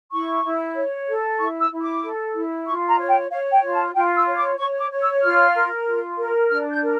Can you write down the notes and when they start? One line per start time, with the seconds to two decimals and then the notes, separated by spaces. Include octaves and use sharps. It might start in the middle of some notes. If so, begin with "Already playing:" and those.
0.11 E4 C#6
0.43 E4
0.75 C#5
1.08 A4
1.39 E4 C#6
1.60 E6
1.71 E4
1.82 D6
2.03 A4
2.35 E4
2.66 F4 C#6
2.88 A#5
2.99 C#5
3.09 G5
3.31 C#5 F5
3.52 G5
3.63 F4
3.73 A5
3.94 F4 G5
4.16 E6
4.27 C#5
4.37 D6
4.58 C#5 C#6
4.79 D6
4.90 C#5
5.01 E6
5.22 F4 F6
5.54 A#4
5.86 F4
6.17 A#4
6.50 D4 F6
6.71 G6
6.82 A#4